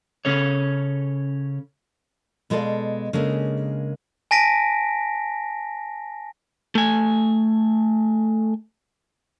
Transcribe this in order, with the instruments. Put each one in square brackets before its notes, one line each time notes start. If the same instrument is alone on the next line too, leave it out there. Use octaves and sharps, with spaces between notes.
[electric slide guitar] C#3 C#4 A4 C#5
[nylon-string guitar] B2 G#3 G#4 A4 D5 F5
C#3 G#3 A#3 D4 A4 A#4
[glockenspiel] G#5 A5 A#6 B6 D7
[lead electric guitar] A3 G#5